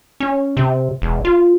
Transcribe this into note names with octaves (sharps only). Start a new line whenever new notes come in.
C#4
C3
E1
F4